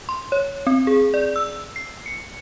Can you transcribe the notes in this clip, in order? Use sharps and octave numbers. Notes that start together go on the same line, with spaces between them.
C6
C#5
C4
G#4
D5
E6
C7
C#7